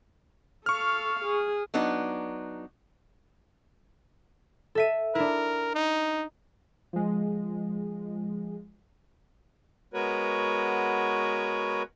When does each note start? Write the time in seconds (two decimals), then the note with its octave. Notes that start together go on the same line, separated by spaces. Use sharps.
0.66 A4 F5 C#6 F6
1.24 G#4
1.74 F#3 B3 D4 D#4
4.75 A4 E5 D#7
5.15 D4 E4 A#4
5.75 D#4
6.93 F3 G#3
9.94 G#3 B3 F#4 A#4 B4 C#5